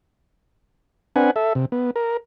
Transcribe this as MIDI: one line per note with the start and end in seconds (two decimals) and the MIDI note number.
1.16 1.31 60
1.16 1.31 62
1.16 1.31 71
1.16 1.31 78
1.16 1.31 80
1.36 1.53 69
1.36 1.53 76
1.55 1.65 48
1.72 1.91 59
1.96 2.17 70